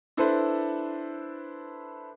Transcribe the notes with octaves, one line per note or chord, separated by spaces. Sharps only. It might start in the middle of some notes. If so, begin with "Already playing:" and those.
D4 E4 A4 B4 C5